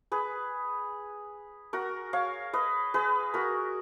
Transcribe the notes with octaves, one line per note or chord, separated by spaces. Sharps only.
G#4 B4
F#4 A#4
C#5 F5
B4 D#5
G#4 B4
F#4 A#4